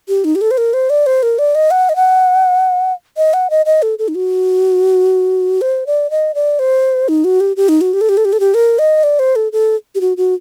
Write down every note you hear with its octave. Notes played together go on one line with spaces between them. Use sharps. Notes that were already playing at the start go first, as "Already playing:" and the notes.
G4
D#4
G4
A4
C5
A#4
C5
D5
C5
A#4
D5
D#5
F#5
D#5
F#5
D#5
F#5
D#5
D#5
A4
A4
D#4
F#4
C5
D5
D#5
D5
C5
D#4
F#4
G4
G4
D#4
F#4
G4
A4
G4
A4
G4
A4
G4
A#4
D#5
D5
C5
A4
A4
G4
F#4
F#4